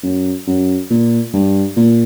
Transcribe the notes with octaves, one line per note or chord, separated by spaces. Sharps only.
F#2
F#2
A#2
G2
A#2